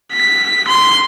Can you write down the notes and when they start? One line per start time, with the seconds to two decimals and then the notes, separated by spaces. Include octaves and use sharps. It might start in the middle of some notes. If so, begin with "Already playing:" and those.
0.13 B6
0.68 C6